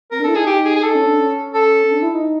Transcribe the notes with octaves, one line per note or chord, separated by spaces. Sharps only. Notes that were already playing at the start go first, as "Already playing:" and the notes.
C4 A#4
D4
A4
E4
D#4 G#4
D#4 G4
G#4
G#4
D#4 A4
C#4
D4
C#4
A4
D4
E4
D#4